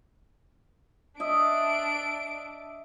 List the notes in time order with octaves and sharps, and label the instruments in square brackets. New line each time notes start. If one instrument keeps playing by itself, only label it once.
[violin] D4 D7 [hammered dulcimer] D#5 E5